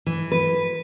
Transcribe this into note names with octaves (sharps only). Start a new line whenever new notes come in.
E3
B4